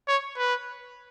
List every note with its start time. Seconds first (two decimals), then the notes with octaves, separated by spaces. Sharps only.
0.08 C#5
0.37 B4